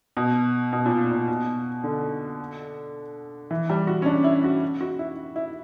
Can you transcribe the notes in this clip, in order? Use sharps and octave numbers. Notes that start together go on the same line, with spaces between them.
B2
B2
A#2
A#2
B2
D3
E3
G3
F#4
C#4
D4
E4
F#4
F#4
E4
E4